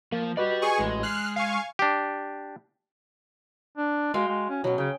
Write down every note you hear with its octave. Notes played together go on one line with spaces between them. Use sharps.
F3 A#3
F#4 G4 B4 D5 D#5
G#4 G#5 C#6
A1 G#3
F6 F#6 C7
F5 G#5 C#6 C7
D4 G4
D4
G#3 F#4 F5 G5
G#3
C#4
B2 F#3 C#4
C#3 G5